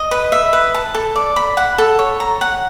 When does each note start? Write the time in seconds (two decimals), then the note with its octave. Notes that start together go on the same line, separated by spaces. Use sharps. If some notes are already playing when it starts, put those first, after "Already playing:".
Already playing: D#5
0.11 B4
0.32 E5
0.53 B4
0.74 A5
0.95 A4
1.16 D5
1.36 B5
1.57 F#5
1.78 A4
1.99 C#5
2.20 A#5
2.41 F#5